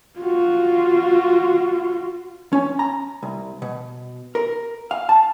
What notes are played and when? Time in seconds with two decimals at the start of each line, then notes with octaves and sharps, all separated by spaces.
0.20 F4 F#4
2.53 C#4
2.79 A#5
3.23 C2
3.62 B2
4.35 A#4
4.91 F5
5.09 A5